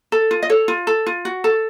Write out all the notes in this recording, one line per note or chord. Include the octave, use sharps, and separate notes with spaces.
A4
F4
D#5
A4 C#5
F4
A4
F4
F#4
A4